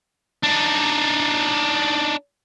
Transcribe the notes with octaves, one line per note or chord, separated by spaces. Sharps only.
D4 D#4